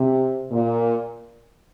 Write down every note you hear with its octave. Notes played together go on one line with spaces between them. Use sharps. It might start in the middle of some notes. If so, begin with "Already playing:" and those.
Already playing: C3
A#2